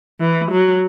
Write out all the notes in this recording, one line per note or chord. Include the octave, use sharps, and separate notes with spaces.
E3
F#3